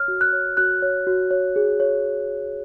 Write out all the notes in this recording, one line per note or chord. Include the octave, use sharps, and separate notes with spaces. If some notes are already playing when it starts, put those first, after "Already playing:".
Already playing: C#5 F6
F#4
F#6
C#5
F#4 F#6
C#5
F#4
C#5
G#4
C#5